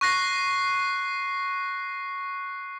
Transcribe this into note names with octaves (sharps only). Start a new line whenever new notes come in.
C#6 F#6 A#6 C7